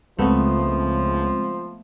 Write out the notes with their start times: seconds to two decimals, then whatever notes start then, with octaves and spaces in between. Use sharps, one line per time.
0.19 C#2 C#3 F3 G#3 A3 B3 C4